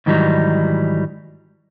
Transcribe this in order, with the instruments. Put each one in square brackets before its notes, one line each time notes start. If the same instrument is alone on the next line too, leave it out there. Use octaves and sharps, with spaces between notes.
[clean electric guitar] G#2 D#3 E3 F#3 G3 D#4